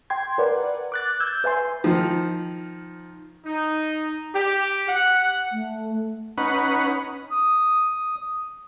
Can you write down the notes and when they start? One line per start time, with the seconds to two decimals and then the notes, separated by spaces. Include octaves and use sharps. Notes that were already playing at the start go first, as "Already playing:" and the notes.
0.10 G5 C6 G#6
0.38 A#4 B4 D5 F#5
0.92 D6 F#6 A6
1.20 E6 G6 G#6
1.44 B4 E5 G#5 C6
1.84 D#3 F3
3.45 D#4
4.34 G4
4.88 F#5
5.51 A3
6.38 C#4 D#4 B4 F#5 B5
7.31 D#6